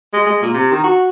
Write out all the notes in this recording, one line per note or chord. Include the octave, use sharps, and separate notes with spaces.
G#3
G#3
A#2
C3
D#3
F#4